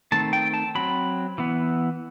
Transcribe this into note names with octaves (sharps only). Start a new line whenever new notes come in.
D#3 A3 C4 A5
G5
A5
F#3 C4 B5
E3 B3